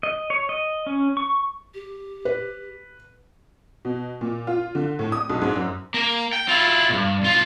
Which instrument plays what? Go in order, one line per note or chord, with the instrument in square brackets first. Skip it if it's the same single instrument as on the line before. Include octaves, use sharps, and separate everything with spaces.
[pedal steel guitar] D#5
C#5
D#5
C#4
C#6
[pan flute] G4
[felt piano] B4
[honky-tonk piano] B2
A#2
F4
D3
A2
D#6
B1
G#2
F#2
[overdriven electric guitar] A#3
G5
E4 F4
G2 A#2
B1 F4